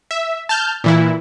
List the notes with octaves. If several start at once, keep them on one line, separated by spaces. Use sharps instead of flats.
E5
A5 F6 G6
A#2 E3 E4